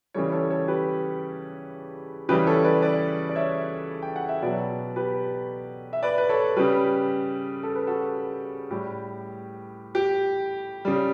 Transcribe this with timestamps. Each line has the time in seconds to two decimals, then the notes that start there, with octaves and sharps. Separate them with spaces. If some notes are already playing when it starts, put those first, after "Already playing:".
0.14 C#3 E3 G3 A4 C#5
0.32 A4 C#5
0.50 A4 C#5
0.68 G4 B4
2.29 C#3 E3 G3 G4 B4
2.47 A4 C#5
2.64 B4 D5
2.82 B4 D5
3.29 D5
3.36 C#5 E5
4.02 G5
4.16 F#5
4.29 E5
4.42 B2 F#3 B4 D5
4.96 G4 B4
5.93 E5
6.03 B4 D5
6.18 B4
6.29 A4 C#5
6.56 C#3 G3 G4 B4
7.63 A4
7.75 B4
7.87 F#4 A4
8.70 A2 G3 G4
9.95 G4
10.85 C#3 G3